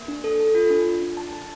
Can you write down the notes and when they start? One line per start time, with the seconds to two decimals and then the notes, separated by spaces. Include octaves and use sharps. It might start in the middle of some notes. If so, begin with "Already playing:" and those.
Already playing: A#3
0.08 D4
0.24 A4
0.40 A4
0.55 F4
0.70 D4
0.87 D4
1.02 D4
1.17 A5
1.33 A5